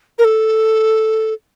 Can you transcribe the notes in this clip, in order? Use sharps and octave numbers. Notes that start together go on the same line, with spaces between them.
A#4
A4